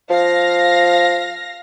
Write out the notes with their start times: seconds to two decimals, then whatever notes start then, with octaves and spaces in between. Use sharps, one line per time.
0.10 F3 F5 A#6